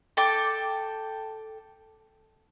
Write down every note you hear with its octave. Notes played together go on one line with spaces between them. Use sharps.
A4 G5 D6